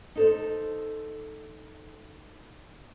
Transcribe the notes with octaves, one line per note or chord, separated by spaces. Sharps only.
D#4 A4 C5